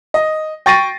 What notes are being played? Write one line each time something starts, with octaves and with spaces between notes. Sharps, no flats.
D#5
G5 C#6 A6 A#6 C7 D#7